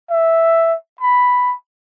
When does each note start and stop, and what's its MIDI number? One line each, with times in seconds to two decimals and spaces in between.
0.10 0.74 76
1.00 1.54 83